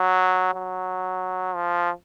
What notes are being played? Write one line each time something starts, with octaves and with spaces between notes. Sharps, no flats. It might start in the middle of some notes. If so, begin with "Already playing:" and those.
Already playing: F#3
F#3
F3